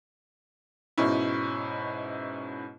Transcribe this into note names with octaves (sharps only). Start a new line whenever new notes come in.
G#2 B2 C#4 E4